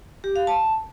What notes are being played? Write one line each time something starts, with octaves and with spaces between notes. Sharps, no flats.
G4
F5
A5